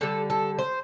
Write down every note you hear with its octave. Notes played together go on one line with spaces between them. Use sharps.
D3 G3 A4
A4
C5